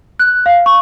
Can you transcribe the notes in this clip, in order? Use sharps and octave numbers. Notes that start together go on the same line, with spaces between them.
F#6
F5
C#6